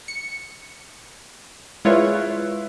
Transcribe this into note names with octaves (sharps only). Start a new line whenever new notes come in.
C#7
G#3 E4 F4 B4 C#5